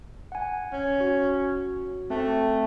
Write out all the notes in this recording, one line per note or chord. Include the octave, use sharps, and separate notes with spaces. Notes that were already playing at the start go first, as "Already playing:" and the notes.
F#5 G#5
C#4
F#4
A3 C4